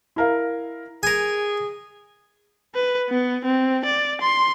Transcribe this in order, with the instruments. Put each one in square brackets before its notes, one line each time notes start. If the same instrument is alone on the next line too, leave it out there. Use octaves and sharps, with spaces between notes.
[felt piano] E4 A#4 F5
[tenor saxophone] G#4 [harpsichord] A#4 G#5
[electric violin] B4
B3
C4
D5
C6